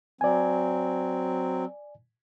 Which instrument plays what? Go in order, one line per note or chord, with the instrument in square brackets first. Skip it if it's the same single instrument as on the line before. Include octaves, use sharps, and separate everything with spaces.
[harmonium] F#3 C4 [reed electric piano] D5 G#5